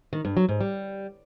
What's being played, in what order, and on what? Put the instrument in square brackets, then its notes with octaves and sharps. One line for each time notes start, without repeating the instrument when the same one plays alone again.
[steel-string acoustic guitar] D#3
G2
F#3
G#2
G3